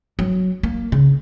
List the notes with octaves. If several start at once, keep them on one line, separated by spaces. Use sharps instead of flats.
F#3
A#3
C#3